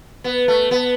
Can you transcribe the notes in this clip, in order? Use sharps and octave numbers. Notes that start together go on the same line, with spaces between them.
B3
A3
B3